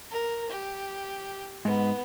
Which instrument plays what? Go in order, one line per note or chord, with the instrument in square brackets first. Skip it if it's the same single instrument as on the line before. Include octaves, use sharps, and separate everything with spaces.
[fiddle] A#4
G4
[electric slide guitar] G#2 [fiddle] B3